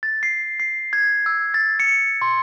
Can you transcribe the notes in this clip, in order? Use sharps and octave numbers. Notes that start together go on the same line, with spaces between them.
A6
C7
C7
G#6
E6
A6
C#7
C6